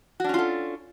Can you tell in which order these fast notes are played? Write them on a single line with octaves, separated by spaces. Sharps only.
F#4 D4 C#4 F4 A4